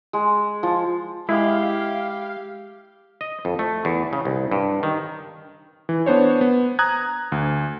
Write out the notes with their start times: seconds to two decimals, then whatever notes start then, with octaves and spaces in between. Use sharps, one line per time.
0.13 G#3
0.63 F3
1.29 G#3 E4 G4 F5
3.21 D#5
3.45 F2
3.59 A3
3.85 E2
4.13 C#3
4.25 C2
4.51 G2
4.83 D#3
5.89 E3
6.06 B3 D4 C5 C#5
6.41 B3
6.79 A#5 D#6 F#6 G#6
7.32 D2